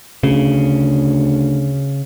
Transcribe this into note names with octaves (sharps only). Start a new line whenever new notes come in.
D2 C#3